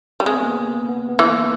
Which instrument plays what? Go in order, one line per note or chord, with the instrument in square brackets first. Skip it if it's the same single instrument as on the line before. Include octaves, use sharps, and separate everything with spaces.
[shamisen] G3
[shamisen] G#3 [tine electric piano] C4
[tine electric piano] B3
A#3
B3
B3
B3
[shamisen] E3
[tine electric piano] A#3